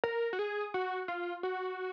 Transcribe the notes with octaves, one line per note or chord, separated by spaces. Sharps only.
A#4
F#4
G#4
F#4
F4
F#4